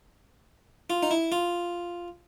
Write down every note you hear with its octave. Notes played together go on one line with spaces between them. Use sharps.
F4
D#4
E4
F4